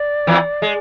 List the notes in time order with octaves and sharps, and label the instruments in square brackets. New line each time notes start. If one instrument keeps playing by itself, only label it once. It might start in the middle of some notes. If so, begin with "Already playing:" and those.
Already playing: [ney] D5
[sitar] E2 E3
G#3